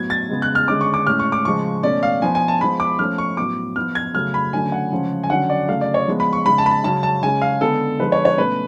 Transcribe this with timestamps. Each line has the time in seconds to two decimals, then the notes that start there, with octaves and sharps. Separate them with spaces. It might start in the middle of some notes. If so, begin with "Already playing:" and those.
Already playing: A2 F#3 B3 G#6
0.10 A6
0.30 C#3 G#3 B3
0.42 F#6
0.55 F6
0.68 D3 G#3 C#4 D6
0.81 C#6
0.94 D6
1.07 A2 G#3 C#4 F6
1.19 C#6
1.32 D6
1.45 C#3 F3 G#3 C#6
1.83 B2 A3 C#4 D5
2.03 F5
2.22 F3 B3 G#5
2.35 G#5
2.48 A5
2.61 F3 G#3 B3 B5
2.80 D6
2.99 F3 A3 C#4 F6
3.18 C#6
3.37 A2 F#3 B3 D6
3.76 F3 B3 F6
3.95 G#6
4.15 C#3 F#3 A3 C#4 F6
4.34 B5
4.53 D3 F#3 A3 C#4 G#5
4.72 F#5
4.92 C#3 F3 G#3 C#4
5.24 G#5
5.30 D3 F#3 C#4 F#5
5.50 D5
5.68 C#3 F#3 A3 F5
5.81 D5
5.94 C#5
6.07 F3 G#3 B3
6.20 B5
6.33 C#6
6.45 C#3 G#3 C#4 B5
6.58 A5
6.66 B5
6.71 A5
6.84 C#3 F#3 C#4 A5
7.03 A5
7.23 C#3 G#3 C#4 G#5
7.42 F5
7.61 D3 G#3 B3 A4
7.99 D3 F3 G#3 B4
8.12 C#5
8.25 C#5
8.37 B2 A3 C#4 B4